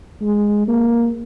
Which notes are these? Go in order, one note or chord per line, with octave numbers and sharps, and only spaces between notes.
G#3
A#3